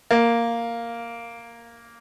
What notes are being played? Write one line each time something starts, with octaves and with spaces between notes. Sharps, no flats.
A#3